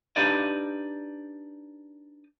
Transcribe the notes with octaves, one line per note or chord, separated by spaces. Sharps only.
D4 D#4 G4 B4 D5 D#5